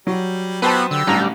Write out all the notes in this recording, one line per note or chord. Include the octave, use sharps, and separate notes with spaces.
F#3 G3
B3 E4 F#4 G4 B4 C5 A5
D3 G4 E6
A1 D2 G3 A#5